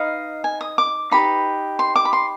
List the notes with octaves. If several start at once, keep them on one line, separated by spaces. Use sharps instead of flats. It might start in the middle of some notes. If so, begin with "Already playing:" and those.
Already playing: D#4 B4 D#5 F5
G#5
D#6
D6
D#4 G4 B4 B5
C6
D6
B5
C6